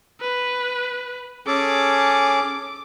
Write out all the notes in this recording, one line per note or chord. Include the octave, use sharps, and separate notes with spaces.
B4
C#4 G#4 A4 D6